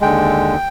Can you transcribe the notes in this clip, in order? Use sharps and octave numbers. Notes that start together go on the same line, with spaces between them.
D#2 D3 G#3 G5